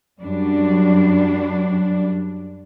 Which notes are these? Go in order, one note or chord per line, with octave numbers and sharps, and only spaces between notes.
F#2 G3 D4